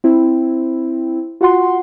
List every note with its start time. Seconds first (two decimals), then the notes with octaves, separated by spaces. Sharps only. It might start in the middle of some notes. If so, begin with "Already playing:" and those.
0.04 C4 E4
1.41 F4 F#4 F#5 C6